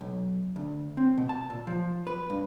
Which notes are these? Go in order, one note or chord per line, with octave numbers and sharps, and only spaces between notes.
B1
D2
C4
B2
A5
A#2
F3
B4
G2